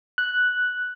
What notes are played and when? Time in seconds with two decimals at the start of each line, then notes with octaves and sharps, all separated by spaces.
0.18 F#6